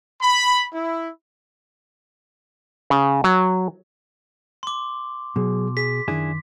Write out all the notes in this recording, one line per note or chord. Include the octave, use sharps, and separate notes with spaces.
B5
E4
C#3
F#3
C6 D6
B2 F#3 G#4
G#4 B6
F#2 D#3 D4 E4 G#4